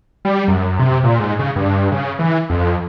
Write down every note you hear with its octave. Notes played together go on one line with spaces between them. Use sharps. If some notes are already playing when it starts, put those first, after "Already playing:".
G3
F#2
C3
A#2
G#2
C#3
G2
C#3
E3
F2